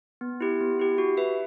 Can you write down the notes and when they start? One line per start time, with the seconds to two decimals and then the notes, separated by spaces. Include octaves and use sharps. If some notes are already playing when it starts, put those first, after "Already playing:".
0.21 B3
0.41 E4 G4
0.61 B3
0.80 E4 G4
0.98 F#4
1.17 B4 E5